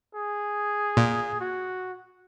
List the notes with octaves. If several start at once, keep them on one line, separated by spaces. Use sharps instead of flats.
G#4
A#2
F#4